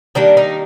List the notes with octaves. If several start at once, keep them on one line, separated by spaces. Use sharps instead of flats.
D#3 G3 A#3 D4
D#4